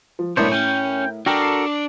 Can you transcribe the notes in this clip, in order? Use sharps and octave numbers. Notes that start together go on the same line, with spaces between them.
F3
B1 A2 B3 D4 E4 A#4 C5 C#5
C#4 G5
D4 F#4 A4 A#4 G5
C7